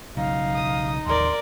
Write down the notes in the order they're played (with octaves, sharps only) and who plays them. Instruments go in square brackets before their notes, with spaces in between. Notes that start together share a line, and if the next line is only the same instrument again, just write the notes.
[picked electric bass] B1 C#3 F#3 [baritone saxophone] D#4 [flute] F5
[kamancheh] D#6
[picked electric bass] A1 D#2 [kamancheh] A#4 D5 [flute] C6